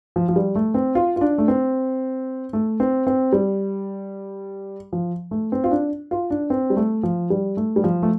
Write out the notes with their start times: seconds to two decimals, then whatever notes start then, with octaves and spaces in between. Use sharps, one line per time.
0.16 F3
0.29 F3
0.36 G3
0.55 A3
0.74 C4
0.95 F4
1.16 F4
1.21 D4
1.38 A3
1.48 C4
2.53 A3
2.80 C4
3.07 C4
3.32 G3
4.93 F3
5.31 A3
5.52 C4
5.64 F4
5.71 D4
6.11 F4
6.31 D4
6.50 C4
6.70 G3
6.77 A3
7.03 F3
7.30 G3
7.57 A3
7.76 G3
7.84 F3
8.03 A3